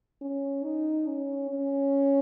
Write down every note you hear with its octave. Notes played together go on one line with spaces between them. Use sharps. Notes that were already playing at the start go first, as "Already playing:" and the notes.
C#4
D#4
C#4
C#4